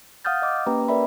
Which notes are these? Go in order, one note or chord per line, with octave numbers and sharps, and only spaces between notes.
F5 F#5 D#6 F6 G6 A6
D#5 D6
A#3 C#4 G4 B4 G5 A#5
A#4 B4 D5 E5 B5